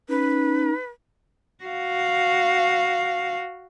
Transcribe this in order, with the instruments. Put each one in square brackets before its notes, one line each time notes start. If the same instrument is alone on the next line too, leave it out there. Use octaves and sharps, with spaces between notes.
[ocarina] C#4 [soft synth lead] D#4 [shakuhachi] B4
[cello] F#4 F5